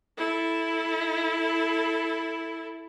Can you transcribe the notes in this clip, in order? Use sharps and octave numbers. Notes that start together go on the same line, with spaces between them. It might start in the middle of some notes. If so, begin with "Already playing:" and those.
E4 A4